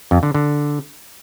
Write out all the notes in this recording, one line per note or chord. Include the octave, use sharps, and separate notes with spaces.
F2
D3
D3